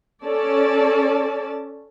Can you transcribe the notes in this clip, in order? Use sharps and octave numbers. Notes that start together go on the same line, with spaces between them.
C#4 A4 D5 A5